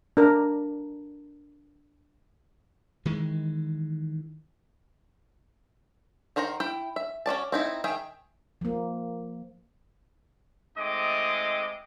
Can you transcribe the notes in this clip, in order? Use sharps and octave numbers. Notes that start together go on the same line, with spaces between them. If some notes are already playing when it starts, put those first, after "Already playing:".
D4 A#4
D#3 E3 G#3
D#3 A#4 C5 F#5 A#5
E4 G5
E5
C#4 F#4 D5 A5
C4 D#4 E4
D#3 G#4 E5 G5
F3 A#3
G#3 A3 C4 D#4 D#5 D6